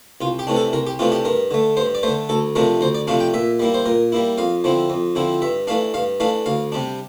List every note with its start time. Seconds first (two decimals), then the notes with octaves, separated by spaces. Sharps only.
0.21 C2 F4
0.39 G4
0.47 C3 E3 A3 D4
0.56 A4
0.73 C2 A#4
0.87 G4
0.99 C3 E3 A3 D4 F4
1.12 G4
1.25 G2 A#4
1.51 D3 A3
1.77 G2 C5
1.95 D5
2.03 D3 A3 C5
2.29 D2 A4
2.55 C3 F3 A3 D4 A#4
2.81 D2 C5
2.95 D5
3.07 C3 F3 A3 D4 F5
3.21 G5
3.34 A#2 E5
3.60 G3 A#3 E4
3.74 C5
3.86 A#2 A#4
4.12 G3 A#3 E4
4.38 F2 F5
4.64 D3 F3 C4 E4
4.90 F2
5.15 D3 F3 C4 E4
5.42 G2 E5
5.67 E3 A3 D4 F5
5.94 G2 F5
6.20 E3 A3 D4 F5
6.46 D2 F5
6.72 C3 G3 D4